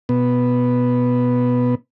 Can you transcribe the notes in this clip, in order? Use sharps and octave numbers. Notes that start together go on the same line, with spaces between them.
B2 B3